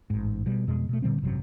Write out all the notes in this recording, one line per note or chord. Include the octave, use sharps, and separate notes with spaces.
A1 G#2
B2 G3
F2 B2 G#3
B2 A3
A#2 D3 G3 C4
G#1 F#2 C3 F#3